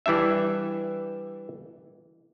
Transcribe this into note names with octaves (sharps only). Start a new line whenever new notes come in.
E3 G3 D4 E5